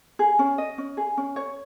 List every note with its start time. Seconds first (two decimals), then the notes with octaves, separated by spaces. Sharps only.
0.19 G#4
0.39 C#4
0.58 D#5
0.78 C#4
0.97 G#4
1.17 C#4
1.36 C#5